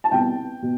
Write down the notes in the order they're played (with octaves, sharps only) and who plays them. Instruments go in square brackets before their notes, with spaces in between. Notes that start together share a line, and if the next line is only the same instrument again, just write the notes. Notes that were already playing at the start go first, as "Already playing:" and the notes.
[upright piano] A5
C2 B2 B3 G5
B2